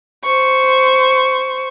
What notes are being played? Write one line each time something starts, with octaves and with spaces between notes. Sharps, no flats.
C5 C#6